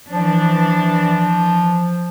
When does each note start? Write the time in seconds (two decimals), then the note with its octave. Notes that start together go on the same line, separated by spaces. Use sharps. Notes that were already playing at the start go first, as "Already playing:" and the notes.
0.11 E3 F3 D4